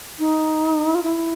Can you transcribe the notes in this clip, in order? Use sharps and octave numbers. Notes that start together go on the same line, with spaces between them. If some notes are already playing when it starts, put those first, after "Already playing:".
D#4
F4
E4